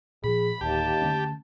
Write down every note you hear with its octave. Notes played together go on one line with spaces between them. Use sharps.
A#2 F3 G#4 B5
D1 D#2 G4 A5
D3 A3 C#4